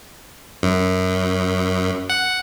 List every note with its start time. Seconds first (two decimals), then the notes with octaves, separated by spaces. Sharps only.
0.63 F#2
2.09 F#5